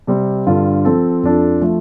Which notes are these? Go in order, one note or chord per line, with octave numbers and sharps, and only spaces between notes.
C3 G3 C4
G2 D3 G3 F4 A4
F3 C4 A4
F2 F3 D4 A4
F3 A3